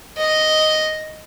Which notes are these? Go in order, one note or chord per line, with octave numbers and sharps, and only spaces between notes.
D#5